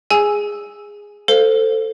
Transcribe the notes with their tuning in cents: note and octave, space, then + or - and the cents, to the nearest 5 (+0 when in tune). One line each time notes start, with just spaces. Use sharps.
G#4 -10 G#5 +0 E6 +0
A4 +15 C5 -5 F5 +0